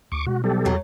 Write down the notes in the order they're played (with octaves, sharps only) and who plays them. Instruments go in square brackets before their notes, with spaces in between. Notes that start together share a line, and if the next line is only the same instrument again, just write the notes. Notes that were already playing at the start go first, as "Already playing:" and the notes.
[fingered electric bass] D2 [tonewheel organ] C#6 D6
[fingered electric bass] B2 G#3 [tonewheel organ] F#4
[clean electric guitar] B1 [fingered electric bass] G3 [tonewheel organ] G4 A4
[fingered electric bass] E2 [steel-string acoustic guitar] F#3 A3